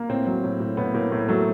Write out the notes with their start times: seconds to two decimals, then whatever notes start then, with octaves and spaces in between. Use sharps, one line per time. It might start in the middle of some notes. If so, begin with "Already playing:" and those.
Already playing: A#3
0.09 A2 C4
0.26 F#3
0.44 A2
0.60 A2
0.77 A2 B3
0.94 A2 A#3
1.12 A2
1.28 F#3 A3